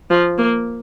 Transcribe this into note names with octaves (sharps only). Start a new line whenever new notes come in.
F3
A#3